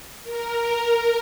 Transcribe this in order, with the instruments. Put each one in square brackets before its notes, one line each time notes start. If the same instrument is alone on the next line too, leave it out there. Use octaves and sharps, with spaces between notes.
[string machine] A#4